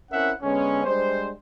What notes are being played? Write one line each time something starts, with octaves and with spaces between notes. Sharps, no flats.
C4 C#4 E4 A#4 E5 F#5
D3 G#3 B3 C#4
G3 G#3 D4 C5